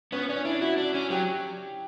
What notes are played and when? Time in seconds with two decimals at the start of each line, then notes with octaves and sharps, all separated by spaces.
0.12 B3 C#4
0.29 C#4 D4
0.45 D4 E4
0.61 E4 F#4
0.78 D4
0.94 C#4
1.10 F#3 G4